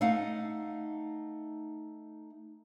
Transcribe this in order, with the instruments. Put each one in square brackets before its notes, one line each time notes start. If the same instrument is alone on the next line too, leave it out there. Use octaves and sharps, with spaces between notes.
[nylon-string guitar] A3 D#4 F5 F#5